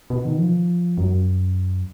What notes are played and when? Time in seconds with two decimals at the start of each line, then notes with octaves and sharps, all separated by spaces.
0.10 B2
0.25 D#3
0.38 F3
0.98 F#2